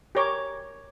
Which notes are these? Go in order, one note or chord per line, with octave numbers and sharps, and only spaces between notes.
G4 A#4 C#5 D6